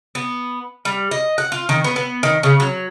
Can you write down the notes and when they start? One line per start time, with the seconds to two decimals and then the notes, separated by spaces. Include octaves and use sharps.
0.15 B3
0.85 G3
1.11 D#5
1.38 F#5
1.52 F4
1.69 D#3
1.84 B3
1.96 B3
2.23 D#3
2.43 C#3
2.60 F#3